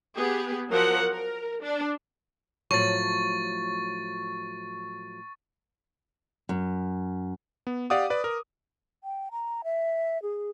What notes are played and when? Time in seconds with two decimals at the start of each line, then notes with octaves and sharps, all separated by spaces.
0.16 B3 G4 G#4
0.69 F3 F#3 A#4 F#5
1.12 A#4
1.63 D4
2.71 A2 F3 F#3 C#6 A6
6.49 F#2
7.67 B3
7.90 G4 D5 F5 F#5 D6 D#6
8.10 B4 D5
8.24 A#4
9.04 G5
9.31 A#5
9.64 E5
10.22 G#4